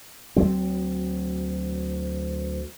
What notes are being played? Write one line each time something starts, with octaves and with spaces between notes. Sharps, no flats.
D2 F#3 C4